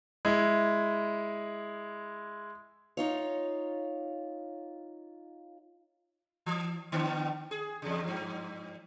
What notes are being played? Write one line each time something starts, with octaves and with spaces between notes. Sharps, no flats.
G#3 E4
D#4 F4 C#5
E3
D3 B3 D4
G#4
E2 C#3
G2 F3